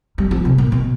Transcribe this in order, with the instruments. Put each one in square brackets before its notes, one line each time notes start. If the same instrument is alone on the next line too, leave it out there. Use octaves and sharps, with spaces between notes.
[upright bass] G3
F3
C3
A#2
B2